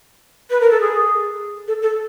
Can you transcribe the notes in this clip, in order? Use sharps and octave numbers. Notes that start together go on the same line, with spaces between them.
B4
A#4
A4
G#4
A4
A4